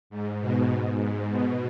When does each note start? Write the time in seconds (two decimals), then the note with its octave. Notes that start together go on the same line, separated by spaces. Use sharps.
0.10 G#2
0.40 B2
0.70 G#2
1.00 G#2
1.30 B2